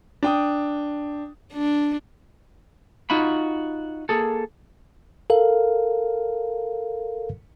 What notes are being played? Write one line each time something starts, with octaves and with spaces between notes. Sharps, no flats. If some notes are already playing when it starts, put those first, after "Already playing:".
D4 G5 D#6
D4
D#4 F4 F#4 B5
A#3 G#4 A4
A4 A#4 F5